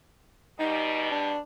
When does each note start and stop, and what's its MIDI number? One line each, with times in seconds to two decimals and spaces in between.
0.59 1.34 47
0.59 1.34 55
0.59 1.08 63
1.11 1.39 62